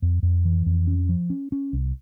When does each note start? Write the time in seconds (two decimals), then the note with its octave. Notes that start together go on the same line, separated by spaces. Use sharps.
0.02 F2
0.23 F2
0.45 E3
0.66 F2
0.87 C#4
1.09 F3
1.30 C#4
1.52 C#4
1.73 C2